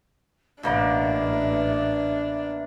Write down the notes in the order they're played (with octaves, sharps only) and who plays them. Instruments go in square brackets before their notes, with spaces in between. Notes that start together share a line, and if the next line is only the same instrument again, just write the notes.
[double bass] A1 [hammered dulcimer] B2 A#3 F#5 [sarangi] D4 [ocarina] E5